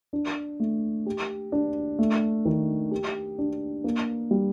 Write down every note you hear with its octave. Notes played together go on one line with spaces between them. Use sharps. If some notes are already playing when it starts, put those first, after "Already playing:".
D4
A3
G4
D4
A3
D#3
G4
D4
A#3
G3